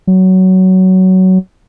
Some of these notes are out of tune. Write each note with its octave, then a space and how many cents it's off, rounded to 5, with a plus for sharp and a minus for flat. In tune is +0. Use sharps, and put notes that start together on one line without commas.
F#3 +15